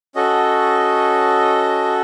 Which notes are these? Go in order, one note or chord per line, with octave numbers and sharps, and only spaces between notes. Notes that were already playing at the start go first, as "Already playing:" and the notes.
C#4 F#4 A4 D#5